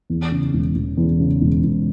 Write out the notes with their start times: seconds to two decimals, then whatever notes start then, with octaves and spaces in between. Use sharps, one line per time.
0.10 E2
0.32 C#3
0.54 E1
0.75 E1
0.97 E2
1.20 C#3
1.42 E1
1.64 E1